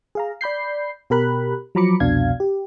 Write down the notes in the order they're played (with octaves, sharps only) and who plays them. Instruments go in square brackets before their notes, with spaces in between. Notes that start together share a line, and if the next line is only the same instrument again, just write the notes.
[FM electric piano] G#4 F5 A#5
D5 B5 G6 C7
B2 G4 A#4 B5 F#6
F3 F#3 A#5 B5 D6 C#7
C2 F2 B2 D4 F5 G#6
G4